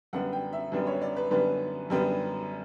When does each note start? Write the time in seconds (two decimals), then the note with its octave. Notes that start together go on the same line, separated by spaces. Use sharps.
0.13 F#2 D3 G3 B3 D4 F#5
0.33 G5
0.53 E5
0.72 F#2 D3 G3 B3 D4 B4
0.87 C#5
1.01 D5
1.16 B4
1.30 F#2 D3 G3 B3 D4 B4
1.90 F#2 D3 G3 B3 D4